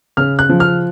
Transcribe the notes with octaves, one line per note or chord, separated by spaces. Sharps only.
C#3 F6
F#6
F3
F6